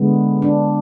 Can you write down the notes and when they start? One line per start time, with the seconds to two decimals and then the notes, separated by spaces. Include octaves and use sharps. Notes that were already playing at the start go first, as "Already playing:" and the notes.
Already playing: D3 G#3 B3
0.42 D4